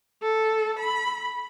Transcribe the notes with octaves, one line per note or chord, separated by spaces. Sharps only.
A4
B5